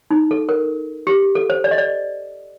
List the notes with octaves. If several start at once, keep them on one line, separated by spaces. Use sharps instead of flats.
D#4
A4
A#4
G4
A4
C5
D5
D#5
D5